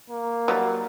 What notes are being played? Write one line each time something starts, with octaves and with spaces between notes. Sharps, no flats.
A#3
F#3 G3 D#4